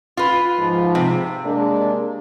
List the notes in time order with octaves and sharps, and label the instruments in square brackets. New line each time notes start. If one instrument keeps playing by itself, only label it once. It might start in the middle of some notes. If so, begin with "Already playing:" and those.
[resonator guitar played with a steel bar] F4 B4
[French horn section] G#2 F3
[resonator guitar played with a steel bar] C3
[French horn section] G#3 A#3 D4